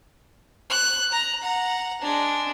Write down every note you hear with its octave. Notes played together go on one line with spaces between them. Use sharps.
F#6
A#5
F#5 A#5
G#3 D4